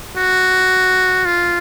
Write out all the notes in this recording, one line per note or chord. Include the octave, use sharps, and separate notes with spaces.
F#4
F4